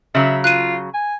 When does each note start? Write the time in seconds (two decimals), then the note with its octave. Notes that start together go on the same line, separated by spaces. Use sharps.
0.15 C#3 F#3 E5
0.44 F4 F#6 D#7
0.94 G#5